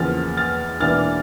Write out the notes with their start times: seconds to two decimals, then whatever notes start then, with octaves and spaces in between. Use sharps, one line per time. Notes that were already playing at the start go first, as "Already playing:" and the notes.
Already playing: E2 C#3 F3 A#3 F6 A6
0.37 F6 A6
0.80 E1 E2 E3 A#3 D4 F6 A6